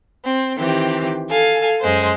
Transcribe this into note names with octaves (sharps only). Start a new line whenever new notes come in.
C4
D#3 E3 C4 G4
A4 F5 G#5
F#2 G#3 C5